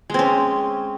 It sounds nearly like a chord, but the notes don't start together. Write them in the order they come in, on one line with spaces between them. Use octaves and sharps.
G#3 C4 C#4